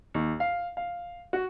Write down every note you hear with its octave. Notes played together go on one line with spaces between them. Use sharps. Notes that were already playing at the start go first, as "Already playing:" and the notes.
D#2
F5
F5
F#4